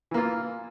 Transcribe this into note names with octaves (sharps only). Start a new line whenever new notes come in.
E3 A#3 F4